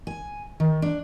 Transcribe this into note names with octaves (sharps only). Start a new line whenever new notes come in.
G#5
D#3
D4